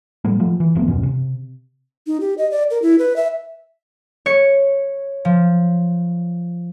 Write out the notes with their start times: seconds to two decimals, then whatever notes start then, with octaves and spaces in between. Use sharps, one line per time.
0.25 A2 F3 G3 A3
0.40 F3 A3
0.60 E3
0.75 F1 F3 A3 B3
0.88 D#1 F#2 B2 C#4
1.03 C3
2.07 D#4
2.21 G4
2.38 D#5
2.51 D5
2.70 A#4
2.82 E4
2.99 B4
3.16 E5
4.26 C#5 C#7
5.25 F3